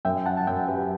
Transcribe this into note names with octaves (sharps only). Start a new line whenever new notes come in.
F#2 E5 G5
F#5 A5
A5
F#2 E5 G5
G4 B4